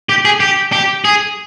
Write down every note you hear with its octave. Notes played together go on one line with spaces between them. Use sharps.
G4
G#4
G4
G4
G#4